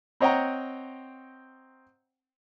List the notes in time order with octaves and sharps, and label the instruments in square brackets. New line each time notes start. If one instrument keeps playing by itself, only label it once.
[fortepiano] C4 C#5 D#5 F#5 G5 A#5